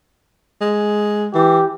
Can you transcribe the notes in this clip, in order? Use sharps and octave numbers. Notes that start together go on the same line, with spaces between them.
G#3
E3 G4